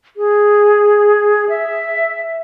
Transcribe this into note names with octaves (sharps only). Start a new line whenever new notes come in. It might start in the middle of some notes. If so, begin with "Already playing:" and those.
G#4
E5